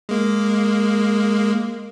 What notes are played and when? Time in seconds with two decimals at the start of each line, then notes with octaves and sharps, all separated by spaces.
0.09 G#3 A#3